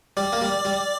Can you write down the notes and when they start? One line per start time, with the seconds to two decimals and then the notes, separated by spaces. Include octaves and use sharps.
0.17 G3 D5
0.33 A#3
0.41 G3
0.65 G3